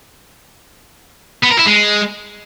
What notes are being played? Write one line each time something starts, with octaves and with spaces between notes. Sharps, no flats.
B3
A#4
E4
G#3